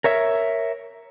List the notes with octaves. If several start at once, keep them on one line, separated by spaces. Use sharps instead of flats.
A#4 C#5 E5